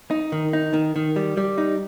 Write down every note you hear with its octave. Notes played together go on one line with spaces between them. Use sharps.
D#4
D#3
D#4
D#3
D#3
G3
G3
D#4